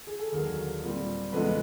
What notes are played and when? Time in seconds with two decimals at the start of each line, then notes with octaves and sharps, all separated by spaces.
0.07 G#4
0.19 A4
0.32 D#2 D3 F#3 G#4 A#4
0.84 A#2 G3 C4
1.33 E2 C#3 F3 G#3 B3 A4 B4